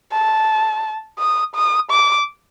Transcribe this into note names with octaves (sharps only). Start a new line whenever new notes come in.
A5
D#6
D#6
D6